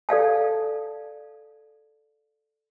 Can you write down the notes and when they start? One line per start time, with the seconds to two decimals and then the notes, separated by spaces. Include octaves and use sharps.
0.09 A4 D5 F5 A5